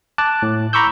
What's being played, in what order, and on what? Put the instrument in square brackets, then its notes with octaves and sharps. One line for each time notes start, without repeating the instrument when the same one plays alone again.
[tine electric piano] A5 D6 F#6
A2
A#5 B5 C#6 D6 E6 G6